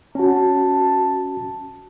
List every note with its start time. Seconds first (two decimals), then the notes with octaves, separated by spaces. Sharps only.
0.15 C#4 F#4 A5